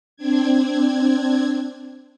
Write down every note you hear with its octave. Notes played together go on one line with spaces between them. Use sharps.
C4 D4 G#6